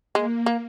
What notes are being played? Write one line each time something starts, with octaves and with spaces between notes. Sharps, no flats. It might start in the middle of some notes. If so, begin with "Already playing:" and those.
G#3 A#3
A#3